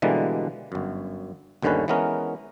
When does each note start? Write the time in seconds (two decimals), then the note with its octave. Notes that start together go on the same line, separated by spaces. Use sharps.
0.02 B2 D3 E3 G3 G#3 A#3
0.72 G1 F#2
1.62 G1 D#2 D3 D#3 C#4 B4
1.88 E3 G#3 B3 C#4 A#4